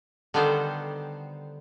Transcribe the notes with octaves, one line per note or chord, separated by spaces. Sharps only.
D3 D#3 G3 B3 A4 C5